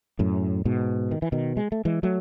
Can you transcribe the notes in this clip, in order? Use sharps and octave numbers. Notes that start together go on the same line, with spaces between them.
F#2 A2
G#2 B2
D#3
E3
B2 D#3
G#3
A3
E3 G#3
F#3 A3